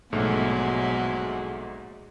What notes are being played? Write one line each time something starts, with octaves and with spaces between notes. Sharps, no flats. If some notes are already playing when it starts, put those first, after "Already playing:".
A#1 G#2 B2 F#3 G#3 A3